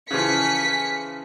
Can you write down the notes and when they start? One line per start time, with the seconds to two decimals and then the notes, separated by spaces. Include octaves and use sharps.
0.11 C#3 E3 F3 G#5 B6 C#7